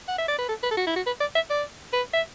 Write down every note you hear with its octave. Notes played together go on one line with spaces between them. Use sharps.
F#5
E5
D5
B4
A4
B4
A4
F#4
E4
F#4
B4
D5
E5
D5
B4
E5